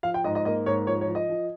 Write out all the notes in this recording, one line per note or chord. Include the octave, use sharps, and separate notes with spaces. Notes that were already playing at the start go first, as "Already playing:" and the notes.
F3 F5
G5
G#2 D#5
D#5
A#3 D#5
G#2 C#5
F3 C#5
C#5
F3
D#5
F3